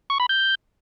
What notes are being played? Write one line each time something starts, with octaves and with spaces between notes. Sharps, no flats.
C#6
B5
G6